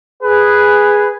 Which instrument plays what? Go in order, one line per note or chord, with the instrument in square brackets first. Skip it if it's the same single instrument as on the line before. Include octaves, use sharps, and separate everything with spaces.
[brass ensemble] G#4 [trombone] B4